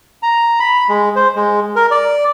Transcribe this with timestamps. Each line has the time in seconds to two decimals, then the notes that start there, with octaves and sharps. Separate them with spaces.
0.23 A#5
0.59 B5
0.89 G#3
1.16 C5
1.35 G#3
1.76 A#4
1.91 D5